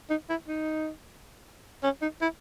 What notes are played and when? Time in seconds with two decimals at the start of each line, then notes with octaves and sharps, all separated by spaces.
0.10 D#4
0.29 E4
0.48 D#4
1.83 C#4
2.02 D#4
2.21 E4